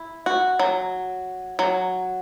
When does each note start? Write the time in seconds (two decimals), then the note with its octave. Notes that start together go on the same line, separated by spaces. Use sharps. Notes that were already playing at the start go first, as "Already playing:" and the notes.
Already playing: E4
0.26 F#4
0.59 F#3
1.59 F#3